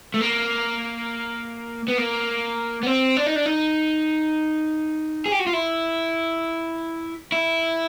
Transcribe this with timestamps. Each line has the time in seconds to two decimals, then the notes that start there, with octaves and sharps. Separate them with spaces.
0.14 A3
0.21 A#3
1.88 B3
1.98 A#3
2.83 B3
2.86 C4
3.17 D4
3.26 D#4
3.36 D4
3.46 D#4
5.26 G#4
5.32 G4
5.39 F#4
5.47 F4
5.53 E4
7.32 E4